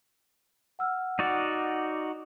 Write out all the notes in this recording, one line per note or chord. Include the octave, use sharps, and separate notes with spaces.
F#5 E6 F6
D#4 F#4 D5